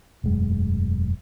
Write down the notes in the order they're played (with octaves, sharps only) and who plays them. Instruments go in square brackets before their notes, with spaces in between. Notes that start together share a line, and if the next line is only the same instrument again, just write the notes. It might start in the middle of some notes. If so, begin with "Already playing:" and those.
[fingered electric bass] E1 F#2 G#3 A3